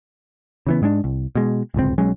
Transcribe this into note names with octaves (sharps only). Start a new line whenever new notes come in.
C#3 E3 B3
G#2 G#3 C#4 D4
C2
B2 G#3
D1 G1 C#2 C4
B1 F#3 G#3 C#4